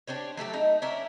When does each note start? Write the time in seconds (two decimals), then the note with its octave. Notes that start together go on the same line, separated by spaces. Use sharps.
0.07 D4 G4 C5 C#5
0.37 F#3 A3 G4 A4
0.53 A3 D#4
0.82 C#4 D4 E4 A#4